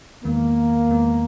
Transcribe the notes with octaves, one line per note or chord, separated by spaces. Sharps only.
E2 D#3 G#3 A#3 B3
E2 D#3 G#3 B3